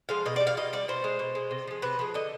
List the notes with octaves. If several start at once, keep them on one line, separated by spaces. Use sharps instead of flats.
F3 G#3 F5
B2 D#5
D5
G3
F5
B2 D#5
G3 D5
B2 C5
G#3
B2
G#3
C3
F3 G#3
C3 B4
F3 G#3
D3 D#5